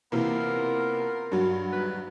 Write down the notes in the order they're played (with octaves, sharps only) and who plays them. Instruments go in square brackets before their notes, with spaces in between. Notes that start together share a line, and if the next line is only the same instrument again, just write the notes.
[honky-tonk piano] C3 E3 A#3 [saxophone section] B3 F4 A#4
[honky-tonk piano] G2 F#3
[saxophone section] D#2 G#2 B4